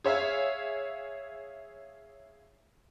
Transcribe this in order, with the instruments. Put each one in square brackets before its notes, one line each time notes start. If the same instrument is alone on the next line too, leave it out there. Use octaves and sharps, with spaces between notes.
[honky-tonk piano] G#4 C#5 E5 F5